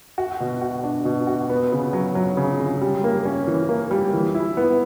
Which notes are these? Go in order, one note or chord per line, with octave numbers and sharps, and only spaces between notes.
F#4
B2
F#4
D4
B2
F#4
B3
C#3
F#3
F#3
C#3
C#3
G3
A#3
C#4
E3
A#3
G3
E3
E4
B3